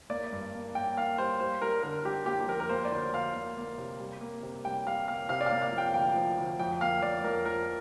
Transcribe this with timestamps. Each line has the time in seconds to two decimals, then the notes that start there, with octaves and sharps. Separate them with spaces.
0.10 A#3 D5
0.32 G2
0.54 A#3
0.75 A#3 G5
0.97 A#3 F5
1.18 G3 C5
1.40 G3 C5
1.61 G3 A#4
1.83 D3 A#4
2.05 G3 G4
2.26 A#3 G4
2.41 G4
2.48 F2 A#4
2.60 A#4
2.69 A#3 C5
2.85 D5
2.92 D2 C5
3.13 D2 F5
3.35 A#3
3.57 A#3
3.78 C3
4.00 G3
4.21 A#3
4.43 C3
4.65 G3 G5
4.87 G3 F5
5.08 A#3 F5
5.29 C3 F5
5.41 D5
5.46 F5
5.51 A#3
5.62 F5
5.72 F3
5.78 G5
5.94 D2 G5
6.15 F3
6.38 D2
6.59 F2 G5
6.81 A#3 F5
7.02 F2 D5
7.24 F2 A#4
7.45 F3 A#4